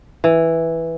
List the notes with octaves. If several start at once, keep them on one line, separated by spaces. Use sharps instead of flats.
E3